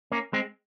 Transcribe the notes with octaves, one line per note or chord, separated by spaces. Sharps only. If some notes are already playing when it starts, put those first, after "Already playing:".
A#3 C#4
G#3 C4